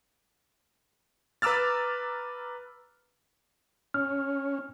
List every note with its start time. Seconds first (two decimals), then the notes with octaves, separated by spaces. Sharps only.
1.42 B4 A#5 D6 E6 F6 A6
3.94 C#4 F6